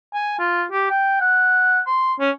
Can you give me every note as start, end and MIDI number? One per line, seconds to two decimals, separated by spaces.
0.14 0.35 80
0.39 0.65 65
0.72 0.86 67
0.90 1.17 79
1.21 1.80 78
1.87 2.13 84
2.20 2.31 61